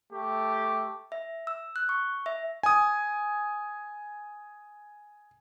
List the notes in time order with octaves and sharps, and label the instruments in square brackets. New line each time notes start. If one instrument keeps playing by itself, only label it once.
[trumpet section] A3 G4
[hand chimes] E5
E6
F#6
C#6
E5
[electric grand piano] G#5 D#6